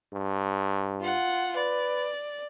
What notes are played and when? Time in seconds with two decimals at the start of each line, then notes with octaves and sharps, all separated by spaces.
0.13 G2
1.01 F4 F#5
1.56 B4 D5